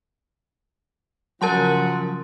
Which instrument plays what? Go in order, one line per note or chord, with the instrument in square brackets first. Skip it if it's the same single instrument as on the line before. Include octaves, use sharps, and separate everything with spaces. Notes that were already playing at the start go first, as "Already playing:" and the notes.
[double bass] C#3 F3 [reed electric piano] F#3 [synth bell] A#4 A5 C6 [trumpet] F#5